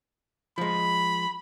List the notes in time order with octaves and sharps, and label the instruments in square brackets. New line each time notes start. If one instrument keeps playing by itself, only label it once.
[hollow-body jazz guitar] F3 G#3 [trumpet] B5